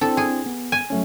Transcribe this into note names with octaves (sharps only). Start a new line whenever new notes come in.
C4 D4 E4 A4
G#4
B3
G#5
F#3 A3 C#4